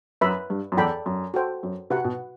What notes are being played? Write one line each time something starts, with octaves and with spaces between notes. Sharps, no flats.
F#2 B4 E5 B5
G2
F#2
E2 A4 D5 G5 B5
F#2
F#4 A4 C5 G5
F#2
C3 F#4 B4 F#5
B2